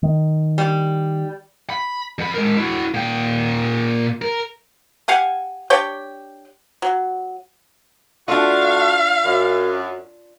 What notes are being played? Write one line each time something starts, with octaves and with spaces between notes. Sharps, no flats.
D#3
G3
B5
F2 B5
G#3 A#4
E4 F#4
A#2 G5
A#4
G4 F5 F#5 G#5
D4 G4 C#5 G5
F#3
A3 D4 F4 F#4 F5
F#2